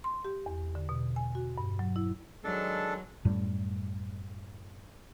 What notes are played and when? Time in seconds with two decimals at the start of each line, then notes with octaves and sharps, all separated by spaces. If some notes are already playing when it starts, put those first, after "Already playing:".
0.04 C6
0.24 G4
0.46 E2
0.75 D3
0.89 B2
1.16 G#5
1.35 F#4
1.58 G2
1.79 F#3
1.96 E4
2.44 D#3 F#3 G#3 D4 A4
3.25 F#2 A2 G3